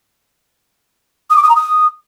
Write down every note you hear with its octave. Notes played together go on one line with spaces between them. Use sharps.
D#6
D6
D#6
A#5
D#6